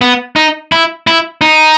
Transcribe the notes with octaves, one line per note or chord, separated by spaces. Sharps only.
B3
D#4
E4
E4
D#4